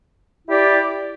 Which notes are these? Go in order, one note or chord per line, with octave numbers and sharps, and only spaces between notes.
E4 G4 D5